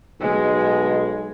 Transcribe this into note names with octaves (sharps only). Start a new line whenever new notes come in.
B1 G#3